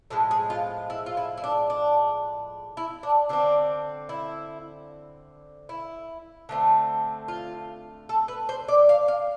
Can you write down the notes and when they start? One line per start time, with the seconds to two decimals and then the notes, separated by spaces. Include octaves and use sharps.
0.10 A2 F3 G#3 A4
0.31 G#4
0.50 F4
0.90 E4
1.06 F4
1.17 E4
1.38 E4
1.44 D4
1.70 D4
2.77 E4
3.03 D4
3.29 D3 A3 C4 D4
4.09 E4
5.69 E4
6.49 D3 A3 C4
7.28 F4
8.09 A4
8.28 B4
8.49 C5
8.68 D5
8.89 F5
9.08 F5